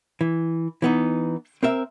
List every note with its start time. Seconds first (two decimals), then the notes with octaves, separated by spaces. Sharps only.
0.21 E3
0.82 E3 B3 D#4
1.63 C4 A#4 E5